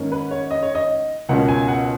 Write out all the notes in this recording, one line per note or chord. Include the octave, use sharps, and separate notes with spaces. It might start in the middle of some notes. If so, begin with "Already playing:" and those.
Already playing: G#2 D#3 A#3 C#4
B4
C#5
D#5
C#5
D#5
C#2 B2 A#3 C#4 F#5
G#5
F#5